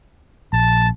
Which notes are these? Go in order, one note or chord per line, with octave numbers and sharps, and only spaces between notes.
A#1 A5